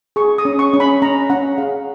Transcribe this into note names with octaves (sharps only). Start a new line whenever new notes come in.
G#4 C#6
D#6
C#4
C#6
C#4
B5
C#4 A#5
C#4 F#5
G#4 F5